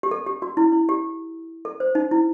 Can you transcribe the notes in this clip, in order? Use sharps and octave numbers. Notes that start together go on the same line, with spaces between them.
G4
A4
G4
F#4
E4
E4
G4
A4
C5
D#4
E4